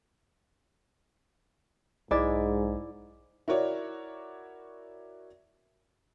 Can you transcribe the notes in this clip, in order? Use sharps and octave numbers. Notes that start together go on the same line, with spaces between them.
B1 G#2 G#3 E4 D5
E4 F#4 A#4 C#5 D5